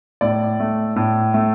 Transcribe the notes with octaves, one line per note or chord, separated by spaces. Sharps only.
A2 D5
A3
A2
A3